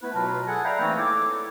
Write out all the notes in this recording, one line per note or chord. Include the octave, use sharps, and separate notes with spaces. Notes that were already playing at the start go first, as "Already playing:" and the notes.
A3 B3 E4 B4
B2 F#3 F4 A#4 B4 A5
G#4 A4 F#5 G#5
D5 E5 F5 G5 A#5 B5
E3 A3 A#3 C4 C#4 D#4
E4 A4 C#5 D6